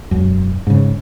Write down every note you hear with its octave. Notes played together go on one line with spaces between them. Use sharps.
E1 F#2
G#2 C#3